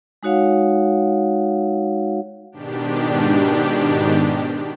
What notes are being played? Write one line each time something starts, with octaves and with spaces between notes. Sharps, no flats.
G#3 D#4 F#4 C#5 F5 F#5
G#2 B2 D#3 D4 G4